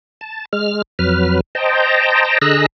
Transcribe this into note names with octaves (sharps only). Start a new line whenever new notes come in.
A5
G#3 F6
F2 F#3 B4 F6
C5 D#5 G5 A5 A#5
D3 G#4 D#5 A#5 E6 F#6